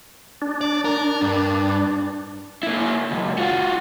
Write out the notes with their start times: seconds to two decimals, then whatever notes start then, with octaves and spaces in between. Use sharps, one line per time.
0.42 D4
0.61 D5
0.85 A#4
1.22 G2
2.63 A#3 E4
3.11 C#2 F#2
3.38 F4 F#4